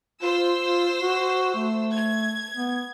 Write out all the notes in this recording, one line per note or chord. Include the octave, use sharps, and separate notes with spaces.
F4 C5 E6
F4
F#4
A3
G#6
B3